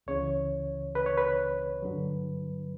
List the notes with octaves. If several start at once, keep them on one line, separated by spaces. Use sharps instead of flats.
C#2 C#3 E3 C#5
B4
C#5
B4
G2 D3 F#3